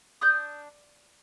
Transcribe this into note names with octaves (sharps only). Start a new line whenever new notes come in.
D4 D#6 G6